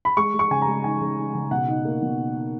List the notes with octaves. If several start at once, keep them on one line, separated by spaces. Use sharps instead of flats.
B5
G#3 C#6
G#3
C#6
C#3 G#5
A#5
G#3
D#4 G#5
C#3
D#4
C#3
B2 F#5
D#4
A#3
B2